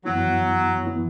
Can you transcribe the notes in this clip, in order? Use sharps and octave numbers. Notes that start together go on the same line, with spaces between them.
F#2 E3 F#3 B3 E4
E3 B3 E4